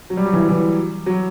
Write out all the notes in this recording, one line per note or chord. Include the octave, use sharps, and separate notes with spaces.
F#3
G3
F#3
E3
E3
F#3